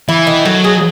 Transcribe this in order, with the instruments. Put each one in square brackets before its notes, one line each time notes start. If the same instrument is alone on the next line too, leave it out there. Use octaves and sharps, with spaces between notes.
[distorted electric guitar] E3 [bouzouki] E4
[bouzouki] D#3
[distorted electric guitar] F#3 [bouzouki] A3
[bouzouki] G#4